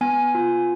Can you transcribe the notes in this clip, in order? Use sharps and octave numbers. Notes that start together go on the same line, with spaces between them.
B3 G#5
F4